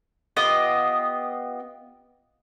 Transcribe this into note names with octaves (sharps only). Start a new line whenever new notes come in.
B3 F4 G4 D#5